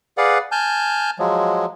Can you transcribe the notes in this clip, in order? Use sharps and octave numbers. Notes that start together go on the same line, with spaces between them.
G#4 B4 D5 F5 F#5
G#5 A5 F6 G6
F3 F#3 G#3